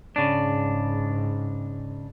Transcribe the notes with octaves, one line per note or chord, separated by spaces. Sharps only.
G#2 C#3 D4